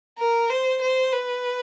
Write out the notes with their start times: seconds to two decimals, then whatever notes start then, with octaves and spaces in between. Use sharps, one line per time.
0.18 A#4
0.50 C5
0.82 C5
1.13 B4